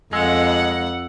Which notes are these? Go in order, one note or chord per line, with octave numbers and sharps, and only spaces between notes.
F2 G#3 F#5 E6